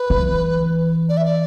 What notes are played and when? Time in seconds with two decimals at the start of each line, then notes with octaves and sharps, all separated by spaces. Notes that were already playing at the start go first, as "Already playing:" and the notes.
Already playing: B4
0.10 E3
1.09 D5
1.17 E5
1.25 D5